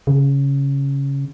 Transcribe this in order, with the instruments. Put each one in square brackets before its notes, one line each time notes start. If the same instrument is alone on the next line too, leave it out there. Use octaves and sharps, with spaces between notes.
[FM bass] C#3